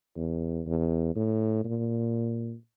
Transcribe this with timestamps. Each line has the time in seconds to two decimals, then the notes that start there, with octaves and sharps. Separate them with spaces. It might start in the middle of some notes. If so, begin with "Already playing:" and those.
0.17 E2
0.66 E2
1.16 A2
1.64 A#2